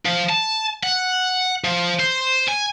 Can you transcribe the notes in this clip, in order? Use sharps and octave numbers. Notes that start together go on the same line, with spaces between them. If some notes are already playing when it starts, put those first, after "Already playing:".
F3
A5
F#5
F3
C5
G#5